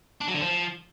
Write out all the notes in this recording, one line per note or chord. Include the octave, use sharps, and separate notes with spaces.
D4
F#3
D3
F3